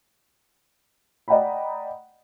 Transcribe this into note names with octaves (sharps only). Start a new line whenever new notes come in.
D5 D#5 F#5 G5 A#5 B5